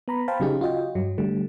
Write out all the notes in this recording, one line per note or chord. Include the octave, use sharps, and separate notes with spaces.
B3 A#5 B5
C5 F5 G5 A5 B5 C6
C#3 F#3 C#4 D#4 G4 G#4
F4 F#4 D#5 G5
G2 F#3
D3 G3 A3